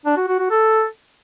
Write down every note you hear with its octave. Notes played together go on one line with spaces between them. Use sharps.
D4
F#4
F#4
F#4
A4